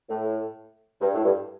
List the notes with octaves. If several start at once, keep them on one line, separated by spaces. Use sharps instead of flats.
A2
G2
A2
G2